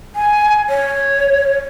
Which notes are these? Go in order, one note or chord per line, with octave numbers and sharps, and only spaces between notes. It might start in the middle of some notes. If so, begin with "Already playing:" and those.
G#5
C#5